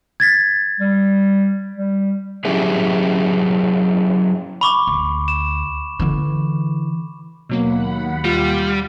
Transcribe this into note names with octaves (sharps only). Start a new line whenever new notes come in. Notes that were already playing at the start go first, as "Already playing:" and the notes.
G#6 A6 B6
G3
G3
F#3 C#4 E4 G4 G#4
B5 C#6 D6
D2
E7
D3 E3
D#2 B2 F#3 A#3 F#5 B5
G3 F4